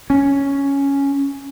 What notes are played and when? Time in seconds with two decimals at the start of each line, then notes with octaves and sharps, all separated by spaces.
0.10 C#4